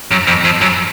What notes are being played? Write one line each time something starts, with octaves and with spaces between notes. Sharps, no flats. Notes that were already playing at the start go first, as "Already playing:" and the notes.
F#2
F2
F2
F#2